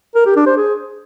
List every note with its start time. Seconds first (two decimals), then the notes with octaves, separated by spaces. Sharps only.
0.15 A#4
0.26 G4
0.36 D4
0.47 C5
0.57 G#4